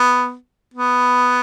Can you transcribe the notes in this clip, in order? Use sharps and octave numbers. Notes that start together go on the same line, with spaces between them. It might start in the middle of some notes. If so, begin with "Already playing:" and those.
Already playing: B3
B3